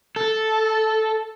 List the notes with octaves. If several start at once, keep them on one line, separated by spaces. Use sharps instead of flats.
A4